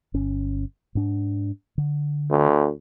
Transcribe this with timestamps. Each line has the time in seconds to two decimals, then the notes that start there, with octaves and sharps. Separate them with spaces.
0.14 G1 C#4
0.95 G#2 D4
1.78 D3
2.30 D2